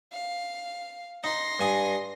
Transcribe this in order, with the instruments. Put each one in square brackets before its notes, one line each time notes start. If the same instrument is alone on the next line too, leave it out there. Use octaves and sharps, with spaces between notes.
[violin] F5
[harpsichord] D#4 [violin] C6 A#6
[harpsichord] G2 G#5 D#6